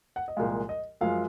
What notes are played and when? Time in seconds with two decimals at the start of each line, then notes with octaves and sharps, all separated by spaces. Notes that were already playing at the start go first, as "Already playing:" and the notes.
0.16 F#5
0.28 D#5
0.37 C2 A#2 F3 G#3 F5
0.69 D#5
1.01 F#2 F3 G#3 F5